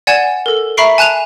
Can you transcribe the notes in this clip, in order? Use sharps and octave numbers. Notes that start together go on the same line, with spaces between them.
D5 F#5 G#5 G#6 E7
A4 A#4
E5 A#5 B5 C#6 C7 D7
G#5 A5 F#6 D#7 F7